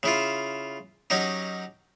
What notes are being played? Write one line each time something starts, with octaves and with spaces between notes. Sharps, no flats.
C#3 E4 F4
F#3 C#4 D#4 G4